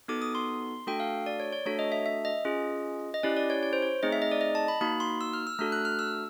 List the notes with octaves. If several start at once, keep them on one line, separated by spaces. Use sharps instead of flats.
B3 D#4 F#4 A4 D6
D#6
C6
A3 D4 F#4 A4 G5
F5
D5
C#5
C#5
A3 D4 F#4 A4 C#5
D#5
E5
E5
D#5
C#4 F4 G#4
D#5
C#4 E4 G4 D5
D5
C#5
C#5
C5
C#5
A3 C4 D#4 G#4 D#5
E5
D#5
D5
D#5
A5
B5
A#3 D#4 F#4 B5
C6
E6
F6
E6
A3 D4 F#4 A4 F6
F#6
F6
E6